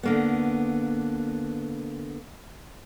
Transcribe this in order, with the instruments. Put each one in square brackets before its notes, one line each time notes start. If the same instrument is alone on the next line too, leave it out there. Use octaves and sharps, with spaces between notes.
[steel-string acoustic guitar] D3 A#3 B3